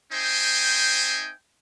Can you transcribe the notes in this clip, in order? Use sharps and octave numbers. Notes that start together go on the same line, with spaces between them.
C4 D#4 C5 E5 G5 G#5